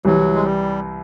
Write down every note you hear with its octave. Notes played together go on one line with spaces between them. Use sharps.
C2 C3 E3 F#3
G#3
G3